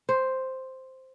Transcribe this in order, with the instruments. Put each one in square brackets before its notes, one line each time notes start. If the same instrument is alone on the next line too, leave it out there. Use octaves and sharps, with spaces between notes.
[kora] C5